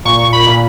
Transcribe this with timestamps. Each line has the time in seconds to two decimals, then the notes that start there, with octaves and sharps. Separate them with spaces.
0.05 A#2 C#6
0.33 B5
0.47 A#2